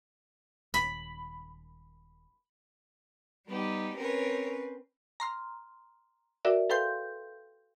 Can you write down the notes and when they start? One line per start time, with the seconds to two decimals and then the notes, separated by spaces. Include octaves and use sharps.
0.74 D#1 B5
3.48 G3 B3 D#4 G4
3.97 C4 C#4 A#4 B4 C#5
5.20 A#5 C6 F6
6.45 F#4 A#4 D5 E5
6.70 A4 B4 F5 G5 C6 G6